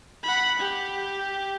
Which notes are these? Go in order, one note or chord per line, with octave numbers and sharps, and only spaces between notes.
F#5 B5
G4